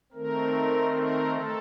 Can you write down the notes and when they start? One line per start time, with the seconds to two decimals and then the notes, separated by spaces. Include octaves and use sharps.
0.12 D#3 A3 C4 A#4
0.91 A#4
1.30 A4